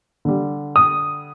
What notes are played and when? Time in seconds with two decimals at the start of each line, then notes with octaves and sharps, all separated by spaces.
0.25 D3 G3
0.76 D#6